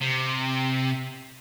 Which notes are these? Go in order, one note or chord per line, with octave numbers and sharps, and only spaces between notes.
C3